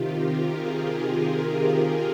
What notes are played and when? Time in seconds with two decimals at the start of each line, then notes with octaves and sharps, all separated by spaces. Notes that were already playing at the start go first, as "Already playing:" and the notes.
Already playing: C3 D#3 F4 G4
0.10 A#4
0.46 G#4
0.82 G4
1.55 F4